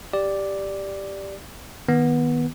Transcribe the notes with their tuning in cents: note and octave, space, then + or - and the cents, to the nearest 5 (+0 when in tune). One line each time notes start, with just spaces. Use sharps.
G4 +0 D5 +0
D#3 +0 B3 -20